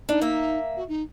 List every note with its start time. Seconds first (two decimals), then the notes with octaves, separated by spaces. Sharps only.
0.09 D4 D#4
0.21 A#3 E5
0.76 F#4
0.88 D#4